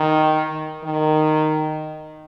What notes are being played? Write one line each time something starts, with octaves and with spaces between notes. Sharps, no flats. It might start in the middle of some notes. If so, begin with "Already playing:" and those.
Already playing: D#3
D#3